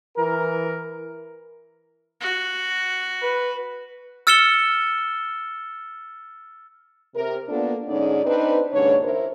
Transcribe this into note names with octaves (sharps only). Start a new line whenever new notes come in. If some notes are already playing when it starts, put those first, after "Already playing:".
E3 A#4
F#4
B4
E6 F6 A6 C#7 E7 G7
C3 A#4
A#3 B3 D4 F4 A4
G#2 D3 C#4 D#4 G#4 D5
C4 D4 D#4 B4
D#2 G#2 C#3 D4 C#5
E4 A#4 C5